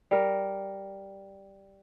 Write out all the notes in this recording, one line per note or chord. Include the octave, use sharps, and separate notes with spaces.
G3 A#4